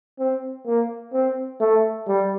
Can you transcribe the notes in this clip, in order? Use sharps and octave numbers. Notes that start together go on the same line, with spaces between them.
C4
A#3
C4
A3
G3